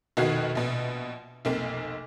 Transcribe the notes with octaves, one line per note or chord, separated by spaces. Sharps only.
F1 B2 D#3 F#4 G#6 C7
A#1 B2
F1 B1 A#3 C4